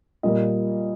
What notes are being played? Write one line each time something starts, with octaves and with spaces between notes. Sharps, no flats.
A#2 G3 A#3 D#5